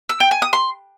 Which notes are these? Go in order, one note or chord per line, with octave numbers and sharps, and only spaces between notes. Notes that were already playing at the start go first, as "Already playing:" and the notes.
E6
G5
G#5
D#6
C6